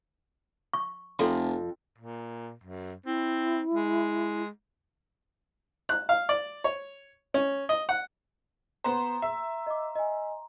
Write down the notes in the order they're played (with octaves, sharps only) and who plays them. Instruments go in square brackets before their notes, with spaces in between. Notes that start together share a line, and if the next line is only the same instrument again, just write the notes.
[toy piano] C#6
[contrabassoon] F1 [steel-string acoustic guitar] F2 [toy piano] A4 C6
[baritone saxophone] A#2
F#2
[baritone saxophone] C4 [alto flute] E4
[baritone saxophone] G#3
[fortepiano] F#6
F5
D5
C#5
C#4
D#5
F#5
[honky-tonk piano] B3 C5 [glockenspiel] A#5 C6
[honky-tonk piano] E5
[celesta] D#5 D6
D#5 G#5